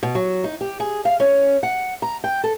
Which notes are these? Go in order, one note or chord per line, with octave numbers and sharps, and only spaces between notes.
B2
F#3
D#4
G4
G#4
F5
C#4
F#5
A#5
G5
A4